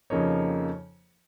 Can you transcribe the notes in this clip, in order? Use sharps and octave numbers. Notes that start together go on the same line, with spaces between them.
F2 C#3 F3 A#3 D#4 C#5